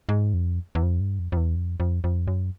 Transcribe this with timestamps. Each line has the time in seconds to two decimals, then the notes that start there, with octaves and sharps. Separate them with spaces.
0.09 G#2
0.34 F2
0.75 E2
0.83 F2
1.00 G2
1.19 F2
1.32 F2
1.37 E2
1.56 F2
1.80 F2
2.04 F2
2.28 F#2